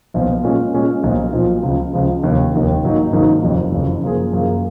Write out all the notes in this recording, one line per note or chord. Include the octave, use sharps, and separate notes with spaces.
B1 A#2 F3 B3
A#2 G#3 C#4 G#4
A#2 G#3 C#4 G#4
B1 A#2 F3
B1 A#2 F3
C#2 C#3 F3
C#2 C#3 F3
F1 D#2 D#3
F1 D#2 D#3
G#1 G#2 F#3 A#3 D#4
G#1 G#2 F#3 A#3 D#4
F#1 F2 C#3 F#3
F#1 F2 C#3 F#3
F#2 F3 A#3 F4 G#4
F#2 F3 A#3 F4 G#4